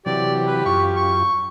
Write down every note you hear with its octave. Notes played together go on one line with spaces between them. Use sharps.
C3 E3 F#3 G4 D5
B4
F#2 F4 C#6
C#6